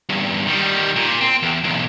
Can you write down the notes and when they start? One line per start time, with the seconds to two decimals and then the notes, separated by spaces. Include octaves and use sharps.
0.09 E2 G2
0.47 D#3 G3
0.96 A#2
1.21 C4
1.43 E2
1.64 B1 E2